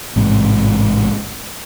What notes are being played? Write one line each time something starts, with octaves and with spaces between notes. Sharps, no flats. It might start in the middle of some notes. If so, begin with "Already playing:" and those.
A1 G#2 C3